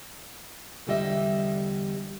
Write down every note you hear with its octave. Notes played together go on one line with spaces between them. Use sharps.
E2 D3 G3 D#5 E5